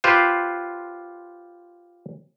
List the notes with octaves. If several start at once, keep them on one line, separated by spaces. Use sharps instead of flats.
F4 G4 B4 C5